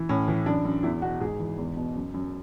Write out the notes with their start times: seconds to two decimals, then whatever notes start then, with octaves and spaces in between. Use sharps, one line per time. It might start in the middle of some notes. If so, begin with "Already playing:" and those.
Already playing: E3
0.09 A2 C#4
0.28 E3
0.46 F#2 D4
0.65 F#2
0.83 E2 E4
1.02 B2 F#4
1.20 G#2 G#4
1.40 E3
1.58 E2
1.77 B2
1.95 F#2
2.14 F#2